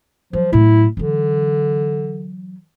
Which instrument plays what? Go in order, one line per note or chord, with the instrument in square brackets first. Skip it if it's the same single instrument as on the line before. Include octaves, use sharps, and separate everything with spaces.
[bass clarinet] F3 [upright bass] F#3
[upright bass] A2 F#3 [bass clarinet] E4
[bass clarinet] D3 [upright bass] E3 F#3